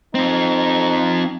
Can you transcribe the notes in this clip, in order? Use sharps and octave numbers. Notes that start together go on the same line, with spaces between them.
F3 C4 D#4